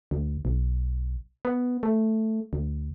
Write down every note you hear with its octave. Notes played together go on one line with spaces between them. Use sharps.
D2
B1
B3
A3
D2